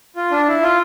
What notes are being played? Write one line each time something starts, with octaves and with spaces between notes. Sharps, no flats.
F4
D4
E4
F4